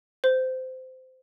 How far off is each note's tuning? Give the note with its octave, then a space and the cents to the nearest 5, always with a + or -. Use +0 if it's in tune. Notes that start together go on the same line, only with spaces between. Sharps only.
C5 -20